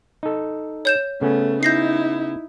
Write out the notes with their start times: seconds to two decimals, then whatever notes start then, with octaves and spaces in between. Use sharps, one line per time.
0.23 D#4 A4
0.85 C#5 G6 E7
1.21 C#3 A3 B3 C#4
1.63 D#4 E4 G6 A#6 C7